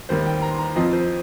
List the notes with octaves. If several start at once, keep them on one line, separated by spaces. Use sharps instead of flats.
D#2 D#3 G3 A#3 C5
G5
A#5
C6
A#5
F2 F3 C4 F4 D#5
C5